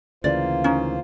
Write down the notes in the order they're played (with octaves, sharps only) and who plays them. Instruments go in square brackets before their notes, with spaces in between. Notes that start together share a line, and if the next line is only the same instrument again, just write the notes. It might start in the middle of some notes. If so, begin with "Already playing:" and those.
[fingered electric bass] D2 C#3 E3 [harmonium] A#3 F4 C5 [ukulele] D5
[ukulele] C#4 D#4